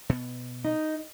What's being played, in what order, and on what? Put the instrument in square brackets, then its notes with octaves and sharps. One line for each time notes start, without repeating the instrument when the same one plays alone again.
[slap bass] B2 B3
[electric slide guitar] D#4